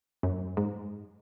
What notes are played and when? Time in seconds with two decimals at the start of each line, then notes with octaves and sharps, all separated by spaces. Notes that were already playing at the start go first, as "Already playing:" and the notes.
0.23 F#2
0.57 G#2